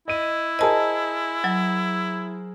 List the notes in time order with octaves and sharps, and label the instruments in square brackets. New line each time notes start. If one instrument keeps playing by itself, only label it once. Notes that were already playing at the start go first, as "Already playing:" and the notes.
[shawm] E4 [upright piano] D#5 D#7
[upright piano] G#4 A#4 C5 [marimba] D#5 A5
[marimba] F#3